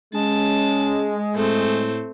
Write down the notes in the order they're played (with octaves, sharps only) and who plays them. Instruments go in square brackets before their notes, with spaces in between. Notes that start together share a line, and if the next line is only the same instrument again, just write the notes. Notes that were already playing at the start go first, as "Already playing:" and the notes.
[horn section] G#3 [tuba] C#4 [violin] A5
[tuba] A2 [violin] A3 C4